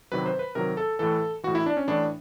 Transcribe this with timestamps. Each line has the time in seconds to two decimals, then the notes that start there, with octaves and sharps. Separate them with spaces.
0.12 C3 D#3 F#3 B4
0.26 C5
0.39 B4
0.55 C3 D#3 F#3 A#4
0.77 A4
0.99 A2 E3 A4
1.43 E3 F#4
1.47 A2
1.55 E4
1.66 D4
1.77 C#4
1.87 A2 E3 D4